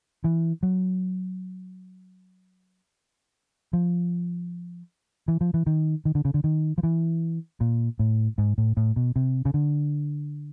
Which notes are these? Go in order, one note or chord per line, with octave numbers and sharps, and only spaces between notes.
E3
F#3
F3
E3
F3
E3
D#3
D#3
D3
C#3
D3
D#3
F3
E3
A#2
A2
G#2
A2
A2
B2
C3
C#3
D3